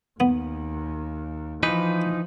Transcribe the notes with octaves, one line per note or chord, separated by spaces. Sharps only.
D#2 B3
E3 F3 D#4 B4